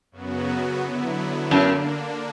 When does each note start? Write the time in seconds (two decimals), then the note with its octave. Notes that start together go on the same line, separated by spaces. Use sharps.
0.11 F#2 C#3 F#3 B3 F#4
0.81 D3 F#3 B3 E4
1.51 F#2 D3 A#3 D4